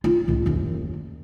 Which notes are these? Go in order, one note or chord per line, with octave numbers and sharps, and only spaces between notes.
F4
C#2 A2
F#1 D#2